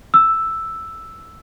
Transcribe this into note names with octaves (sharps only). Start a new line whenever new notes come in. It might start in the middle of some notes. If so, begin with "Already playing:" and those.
E6